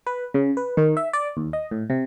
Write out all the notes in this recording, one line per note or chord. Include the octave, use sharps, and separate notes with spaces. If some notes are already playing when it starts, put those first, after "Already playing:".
B4
C#3
B4
D#3
E5
D5
D#2
D#5
A2
C3